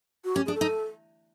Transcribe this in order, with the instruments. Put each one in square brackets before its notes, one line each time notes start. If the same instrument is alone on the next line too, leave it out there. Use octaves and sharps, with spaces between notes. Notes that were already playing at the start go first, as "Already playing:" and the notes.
[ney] F#4
[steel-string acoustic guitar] C#4 [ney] G4
[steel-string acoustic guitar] D4 [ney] G#4
[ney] A4
[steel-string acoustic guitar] D#4